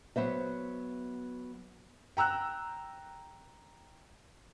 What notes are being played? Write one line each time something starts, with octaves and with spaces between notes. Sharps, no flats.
F#3 B3 C5 E5
G5 A#5 E6 F#6